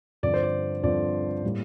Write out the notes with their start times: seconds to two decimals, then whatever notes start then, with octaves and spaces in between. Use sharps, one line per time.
0.23 G2 D3 F3 C4 D5
0.34 C5
0.43 D5
0.83 G2 D3 F3 C4 D5
1.44 A2 G3 A#3